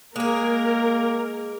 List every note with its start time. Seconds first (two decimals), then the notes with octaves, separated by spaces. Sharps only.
0.16 G#3 A#3 G#4 A#4